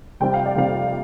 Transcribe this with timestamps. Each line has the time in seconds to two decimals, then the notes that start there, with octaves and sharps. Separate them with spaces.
0.20 F2 C3 G3 C4 G5
0.34 F5
0.46 D5
0.56 F2 C3 G3 C4 F5